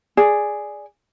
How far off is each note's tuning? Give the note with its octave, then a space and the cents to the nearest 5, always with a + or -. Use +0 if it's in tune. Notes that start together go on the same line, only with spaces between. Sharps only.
G#4 +0 D5 +0